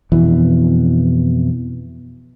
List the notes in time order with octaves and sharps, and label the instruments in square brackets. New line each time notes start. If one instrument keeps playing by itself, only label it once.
[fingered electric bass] F2 B2 E3